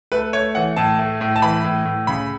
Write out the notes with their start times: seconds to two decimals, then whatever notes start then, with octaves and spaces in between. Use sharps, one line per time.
0.12 A3 B4
0.33 A3 C#5
0.55 E3 F#5
0.76 A2 A5
0.99 A3
1.21 A2
1.36 A5
1.42 E3 B5
1.64 A2
1.85 A2
2.07 C#3 B5